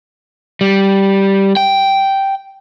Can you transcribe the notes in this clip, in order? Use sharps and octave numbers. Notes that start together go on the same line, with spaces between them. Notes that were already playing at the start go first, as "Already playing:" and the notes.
G3
G5